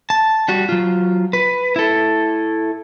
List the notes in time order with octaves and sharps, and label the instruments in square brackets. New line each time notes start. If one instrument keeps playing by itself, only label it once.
[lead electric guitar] A5
G3 F#4
F#3 F4
B4
E4 A4